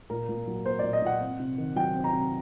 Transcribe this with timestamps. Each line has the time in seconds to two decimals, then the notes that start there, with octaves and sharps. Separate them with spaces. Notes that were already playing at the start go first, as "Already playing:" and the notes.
0.10 A#2 A#4
0.29 A#2
0.47 F#3
0.65 A#3 C5
0.79 A#2 D5
0.93 D#5
1.02 A#2 F#5
1.20 C4
1.39 C3
1.58 D#3
1.76 F#3 G5
1.95 C4
2.04 A#5
2.13 C3